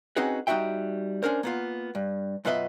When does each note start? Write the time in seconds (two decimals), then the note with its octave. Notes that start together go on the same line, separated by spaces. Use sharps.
0.16 C4 C#4 D#4 F#4 G#4 B4
0.47 G3 D#4 F4 F#4 E5 G5
1.23 C#4 D4 A#4 C5
1.43 A#3 B3 F4
1.95 G2
2.45 F#2 B2 F4 B4 D#5 E5